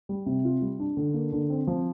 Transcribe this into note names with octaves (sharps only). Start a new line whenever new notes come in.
G3
C3
F4
G3
D4
D3
A#3
D3
C4
F3